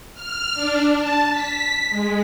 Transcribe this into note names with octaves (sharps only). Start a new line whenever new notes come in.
F6
D4
A5
B6
G#3